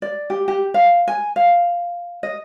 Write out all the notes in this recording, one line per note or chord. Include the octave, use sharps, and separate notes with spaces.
D5
G4
G4
F5
G#5
F5
D#5